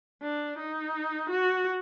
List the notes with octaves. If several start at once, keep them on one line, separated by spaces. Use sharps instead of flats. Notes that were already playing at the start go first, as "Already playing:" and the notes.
D4
D#4
F#4